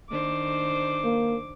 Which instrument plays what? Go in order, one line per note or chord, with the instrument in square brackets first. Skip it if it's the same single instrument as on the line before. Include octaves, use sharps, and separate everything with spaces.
[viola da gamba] D#3 D4 C5 [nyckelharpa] D6
[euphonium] A#3